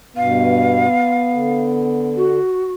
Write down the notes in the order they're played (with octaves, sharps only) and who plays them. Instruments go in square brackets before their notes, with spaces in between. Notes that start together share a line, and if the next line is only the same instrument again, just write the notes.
[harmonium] G2 B2 [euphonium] B3 [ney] F5
[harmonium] D3
[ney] F#4